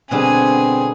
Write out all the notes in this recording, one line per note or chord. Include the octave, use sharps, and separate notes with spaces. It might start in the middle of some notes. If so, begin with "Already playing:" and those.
B2 D3 G3 C4 G#4 G#5